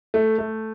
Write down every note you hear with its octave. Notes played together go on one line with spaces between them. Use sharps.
A3
A3